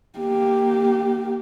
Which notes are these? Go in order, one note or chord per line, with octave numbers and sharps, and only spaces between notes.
A#3 G4